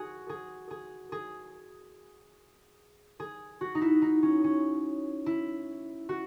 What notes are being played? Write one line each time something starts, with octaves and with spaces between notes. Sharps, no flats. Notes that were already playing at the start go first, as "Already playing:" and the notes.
Already playing: F#4 G#4
G#4
G#4
G#4
G#4
F#4
D#4
E4
D#4
C#4
C#4
E4
F#4